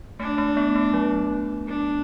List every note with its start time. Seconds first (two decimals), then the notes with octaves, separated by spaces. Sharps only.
0.20 A3 D4
0.38 A3
0.57 B3
0.75 A3
0.93 F#3
1.68 D4